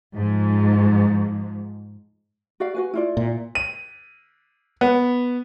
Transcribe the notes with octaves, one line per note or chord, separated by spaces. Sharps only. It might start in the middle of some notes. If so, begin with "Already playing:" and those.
G#2 F3
F#4 D5 F5
F#4 B4 G#5
E4 F4 D5
A#2
D#7
B3